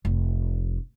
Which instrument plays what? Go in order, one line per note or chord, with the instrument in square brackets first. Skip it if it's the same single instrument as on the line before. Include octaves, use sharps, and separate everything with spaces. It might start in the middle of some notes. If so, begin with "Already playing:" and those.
[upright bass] F1